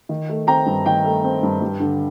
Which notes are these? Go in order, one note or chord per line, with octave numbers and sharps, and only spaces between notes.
D#3
A3
C4 G5 A#5
G2
D#3 G5
A3
C4
G2
G2
D3